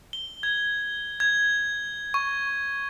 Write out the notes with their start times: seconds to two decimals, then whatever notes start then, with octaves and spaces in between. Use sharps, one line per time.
0.13 G7
0.43 G#6
1.20 G#6
2.14 C#6